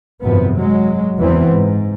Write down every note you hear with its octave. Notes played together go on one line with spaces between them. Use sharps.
G#1 F#2 C3 F3 B3
F#3 G#3
F#1 E2 E3 B3 C4
G#2